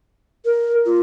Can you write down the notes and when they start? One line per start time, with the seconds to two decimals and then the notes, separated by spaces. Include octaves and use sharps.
0.45 A#4
0.86 F4